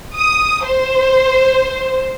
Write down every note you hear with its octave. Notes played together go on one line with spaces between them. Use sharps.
D#6
C5